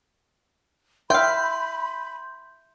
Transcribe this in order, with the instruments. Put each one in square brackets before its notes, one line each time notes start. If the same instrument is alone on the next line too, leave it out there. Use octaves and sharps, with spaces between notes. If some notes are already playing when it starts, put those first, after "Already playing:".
[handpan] E5 [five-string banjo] F5 G5 [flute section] B5 [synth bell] C6 G6